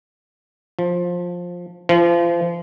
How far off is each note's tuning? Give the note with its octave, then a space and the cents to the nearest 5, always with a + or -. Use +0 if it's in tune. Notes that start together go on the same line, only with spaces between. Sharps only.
F3 +15
F3 -30